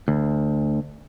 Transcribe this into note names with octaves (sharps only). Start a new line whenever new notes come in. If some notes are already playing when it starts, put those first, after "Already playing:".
D2